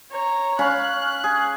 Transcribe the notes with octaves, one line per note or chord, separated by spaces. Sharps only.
C#5 A#5
C#4 F5 B5 F#6
G#4